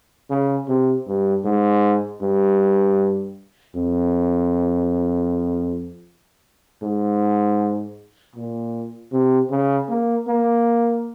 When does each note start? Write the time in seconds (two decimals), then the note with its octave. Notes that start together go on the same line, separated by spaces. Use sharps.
0.30 C#3
0.68 C3
1.08 G2
1.45 G#2
2.22 G2
3.76 F2
6.83 G#2
8.36 A#2
9.12 C3
9.51 C#3
9.89 A#3
10.28 A#3